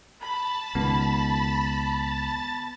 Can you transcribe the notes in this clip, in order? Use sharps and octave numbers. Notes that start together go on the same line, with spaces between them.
A5 B5 A6
C#2 D#3 B3